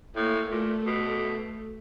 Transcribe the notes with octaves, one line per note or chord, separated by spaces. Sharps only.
A2 A#3
A#2 A3
B2